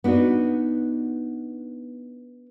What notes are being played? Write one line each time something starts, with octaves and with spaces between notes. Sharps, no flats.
B3 D4 D#4 F#4